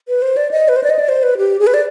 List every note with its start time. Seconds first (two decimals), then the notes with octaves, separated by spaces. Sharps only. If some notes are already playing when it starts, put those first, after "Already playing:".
0.08 B4
0.22 C5
0.37 D5
0.51 D#5
0.68 B4
0.76 C5
0.83 D5
0.90 D#5
0.99 D5
1.09 C5
1.23 B4
1.38 G4
1.59 G#4
1.67 B4
1.74 D5